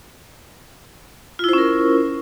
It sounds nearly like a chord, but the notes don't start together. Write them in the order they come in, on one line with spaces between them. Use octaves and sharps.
F4 E4 C5 C#4 A#4